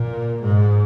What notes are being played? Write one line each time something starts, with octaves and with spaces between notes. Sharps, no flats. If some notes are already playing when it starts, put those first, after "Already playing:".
Already playing: A#2
G#2